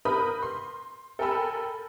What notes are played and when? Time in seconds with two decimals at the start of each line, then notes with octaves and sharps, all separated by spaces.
0.05 A#4 B4 B5 D#6 G6
0.43 C6
1.19 A4 A#4 G5 G#5 B5 E6